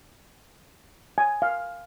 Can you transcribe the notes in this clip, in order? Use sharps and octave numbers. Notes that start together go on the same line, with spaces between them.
G#5
F5